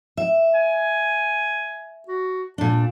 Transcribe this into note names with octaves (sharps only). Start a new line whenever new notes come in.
E5
G#5
F#4
A#2 D4 A5